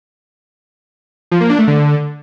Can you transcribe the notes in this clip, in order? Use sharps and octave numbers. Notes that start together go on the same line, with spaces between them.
F3
A#3
D4
A3
D3